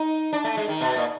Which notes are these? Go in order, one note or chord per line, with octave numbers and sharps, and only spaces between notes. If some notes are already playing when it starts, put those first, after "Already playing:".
Already playing: D#4
D4
A3
G#3
D#3
B2
A#2